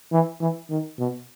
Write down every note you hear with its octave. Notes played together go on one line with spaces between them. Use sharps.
E3
E3
D#3
B2